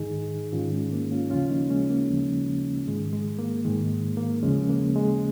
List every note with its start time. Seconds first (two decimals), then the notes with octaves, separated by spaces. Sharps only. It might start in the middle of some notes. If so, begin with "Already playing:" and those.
Already playing: G#2 D#3 D#4 G#4
0.53 G#2 D#3 C#4 F4
0.72 G#3
0.92 A#3
1.11 C#4 F4
1.30 D#2 C#3 F3 C#4 F4
1.50 A#3 D#4
1.69 G#3 C#4
1.90 A#3
2.09 D#2 C#3 F3
2.87 G#2 D#3 G#3
3.12 G#3
3.39 A#3
3.65 G#2 D#3 G#3
4.17 A#3
4.43 D#2 C#3 F3 G#3 C#4
4.69 A#3
4.96 G#3